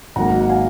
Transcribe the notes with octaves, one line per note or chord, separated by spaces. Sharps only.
G#1 G#2 F#3 A#3 F#5 A#5
F#5
F5 G#5